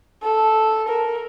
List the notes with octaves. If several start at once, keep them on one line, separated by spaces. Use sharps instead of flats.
A4
A#4